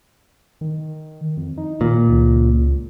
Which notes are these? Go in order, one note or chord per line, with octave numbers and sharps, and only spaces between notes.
D#3
F2
D#4
A#2 D#3
C#2